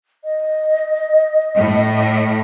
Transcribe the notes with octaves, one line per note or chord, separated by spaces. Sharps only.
D#5
A2